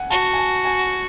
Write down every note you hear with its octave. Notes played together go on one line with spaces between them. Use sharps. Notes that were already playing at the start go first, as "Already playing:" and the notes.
Already playing: F#5 G#5
F#4 A5
G#5
A5
G#5